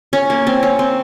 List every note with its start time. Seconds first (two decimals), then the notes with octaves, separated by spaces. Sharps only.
0.13 C#4
0.30 A#3
0.47 C4
0.63 C#4
0.79 C4